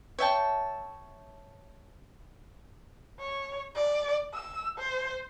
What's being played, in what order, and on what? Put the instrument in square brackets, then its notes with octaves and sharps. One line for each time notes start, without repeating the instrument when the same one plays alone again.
[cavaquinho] C#5 E5 G5 A5
[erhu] C#5
D5
E6
C5